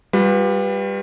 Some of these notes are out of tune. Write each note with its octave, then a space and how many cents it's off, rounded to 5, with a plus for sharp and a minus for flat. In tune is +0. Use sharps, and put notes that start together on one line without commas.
G3 +15 F4 +45 B4 +0